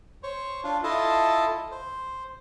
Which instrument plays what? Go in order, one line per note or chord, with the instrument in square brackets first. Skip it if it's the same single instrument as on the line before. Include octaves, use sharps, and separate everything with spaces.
[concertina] C5 C#5
D4 F4
E4 F4 A4 D#5 A5
C5